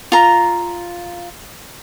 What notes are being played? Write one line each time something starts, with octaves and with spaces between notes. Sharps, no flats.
F4 A#5